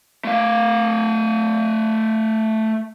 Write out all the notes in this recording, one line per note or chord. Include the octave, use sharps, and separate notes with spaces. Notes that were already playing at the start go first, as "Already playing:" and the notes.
A3 F5